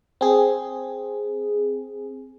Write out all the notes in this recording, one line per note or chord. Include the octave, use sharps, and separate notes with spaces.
C4 G#4